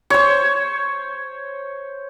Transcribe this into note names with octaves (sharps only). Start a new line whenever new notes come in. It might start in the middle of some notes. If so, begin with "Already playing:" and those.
C5 C#5